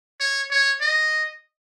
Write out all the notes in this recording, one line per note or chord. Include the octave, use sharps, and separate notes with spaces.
C#5
C#5
D#5